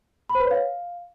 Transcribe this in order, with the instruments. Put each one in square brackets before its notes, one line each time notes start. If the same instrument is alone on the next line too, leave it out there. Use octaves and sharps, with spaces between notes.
[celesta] B5
C5
B4
C#5
F5